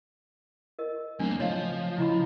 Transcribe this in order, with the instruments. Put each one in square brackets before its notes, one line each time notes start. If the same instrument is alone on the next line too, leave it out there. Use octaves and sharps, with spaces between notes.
[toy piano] A#4 D#5
[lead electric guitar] E2 A#3 [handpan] F#3 A3 C4 [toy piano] D4
[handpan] C#3 [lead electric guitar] F3 [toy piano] C#5 D#5 F5
[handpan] C#3 [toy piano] E4 D#5 B5